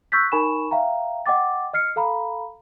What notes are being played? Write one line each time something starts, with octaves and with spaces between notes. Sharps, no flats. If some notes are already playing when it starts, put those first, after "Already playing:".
C#6 E6 F#6 G6 A6 B6
D#4 A#4 G#5 B5 C#6 E7
E5 F5 G5 A#5
D#5 F#5 G5 D6 A6
D#5 F6 C7 C#7
A4 F5 A#5 B5